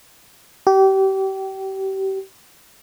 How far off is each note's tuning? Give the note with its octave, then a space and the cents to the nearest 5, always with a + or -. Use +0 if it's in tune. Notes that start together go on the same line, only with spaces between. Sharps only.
G4 -30